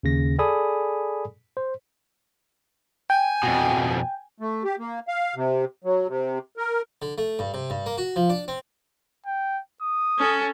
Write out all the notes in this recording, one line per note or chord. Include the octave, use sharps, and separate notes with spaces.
D#2 C#3 A#6
G#4 A4 D5 G#5 B5 D#6
C5
G5 G#5
F2 B2
A3
G4
A#3
F5
C3
F#3
C3
A#4
D3
A3
G2
C3
G2
A#3
F#4
F3
D4
C4
G5
D#6
C#4 A4